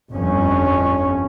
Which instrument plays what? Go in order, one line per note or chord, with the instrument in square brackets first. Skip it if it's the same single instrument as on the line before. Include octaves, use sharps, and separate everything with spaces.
[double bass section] G1 F2 C#4